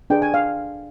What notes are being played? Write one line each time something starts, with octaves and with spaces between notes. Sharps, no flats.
D4 G#4 B4 G5
G#5
F5